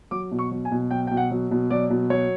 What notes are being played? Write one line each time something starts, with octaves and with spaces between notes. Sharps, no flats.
F#3 D6
B2
C#6
F#3
G#5
B2
F#3 G5
B2 G5
F#5
F#3
B2
F#3 D5
B2
F#3 C#5